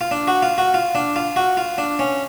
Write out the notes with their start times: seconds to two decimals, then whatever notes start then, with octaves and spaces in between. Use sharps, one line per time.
0.01 F4
0.11 D4
0.28 F#4
0.42 F4
0.58 F#4
0.74 F4
0.95 D4
1.16 F4
1.36 F#4
1.57 F4
1.78 D4
1.99 C#4